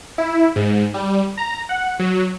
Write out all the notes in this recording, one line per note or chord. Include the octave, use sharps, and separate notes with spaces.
E4
G#2
G3
A#5
F#5
F#3